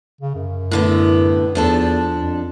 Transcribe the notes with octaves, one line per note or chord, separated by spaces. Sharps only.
C#3
F#2
A2 D3 B3
E2 F3 D4 A4
F2